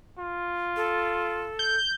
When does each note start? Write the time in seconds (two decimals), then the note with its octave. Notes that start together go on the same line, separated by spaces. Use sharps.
0.19 F4
0.77 A4
1.59 G6